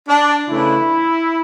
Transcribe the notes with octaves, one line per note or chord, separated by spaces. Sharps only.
D4
C#3 E3 A3 D4 E4